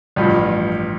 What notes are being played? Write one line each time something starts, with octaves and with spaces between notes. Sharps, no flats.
A1 G2 F3